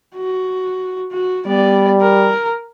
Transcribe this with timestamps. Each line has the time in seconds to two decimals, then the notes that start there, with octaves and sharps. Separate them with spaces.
0.15 F#4
1.12 F#4
1.47 G3 B3 D5
2.02 A#4